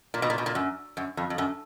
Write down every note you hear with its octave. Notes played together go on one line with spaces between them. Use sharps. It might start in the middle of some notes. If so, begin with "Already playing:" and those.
A#2
B2
A#2
B2
A#2
F#2
F#2
F2
F2
F#2